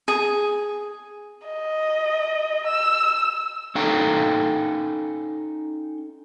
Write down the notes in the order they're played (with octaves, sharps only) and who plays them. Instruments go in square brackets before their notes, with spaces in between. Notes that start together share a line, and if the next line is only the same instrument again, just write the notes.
[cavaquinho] G#4
[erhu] D#5
E6
[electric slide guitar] C#4 D#4 A4 F5 G5 A#5